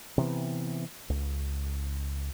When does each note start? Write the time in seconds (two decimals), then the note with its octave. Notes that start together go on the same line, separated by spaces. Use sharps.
0.18 C3 E3 B3
1.10 C#2